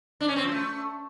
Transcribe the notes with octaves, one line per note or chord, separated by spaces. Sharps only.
D4
C#4
C4
F3
A3